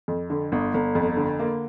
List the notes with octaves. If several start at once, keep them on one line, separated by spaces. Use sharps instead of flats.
F2
D3
G1
G1
F2
D3
A#3